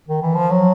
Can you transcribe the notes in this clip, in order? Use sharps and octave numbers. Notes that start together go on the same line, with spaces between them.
D#3
E3
F3
F#3